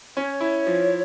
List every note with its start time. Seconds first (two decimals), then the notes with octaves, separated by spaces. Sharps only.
0.16 C#4 C#5
0.41 E4
0.67 F3